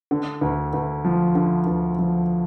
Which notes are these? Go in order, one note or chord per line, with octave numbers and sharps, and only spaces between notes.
D3
D2
D2
F3
D3
D2
F3